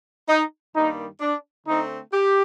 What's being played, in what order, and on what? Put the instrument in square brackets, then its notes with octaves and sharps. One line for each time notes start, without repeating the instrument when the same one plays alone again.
[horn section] D#4
G2 D#3 G3 A#3 D#4
D4
D3 A3 C4 D#4
G4